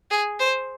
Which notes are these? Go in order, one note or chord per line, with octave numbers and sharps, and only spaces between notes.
G#4
C5